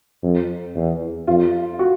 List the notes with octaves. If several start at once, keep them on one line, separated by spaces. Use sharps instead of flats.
F2
E2
F2 F4
F#4